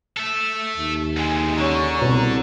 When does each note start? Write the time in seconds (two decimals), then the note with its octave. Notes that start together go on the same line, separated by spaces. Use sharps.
0.17 A4 E5
0.77 D#2
1.17 D2 G#3 G#5
1.57 D3 C#4 A#5 C#6
2.02 C2 B2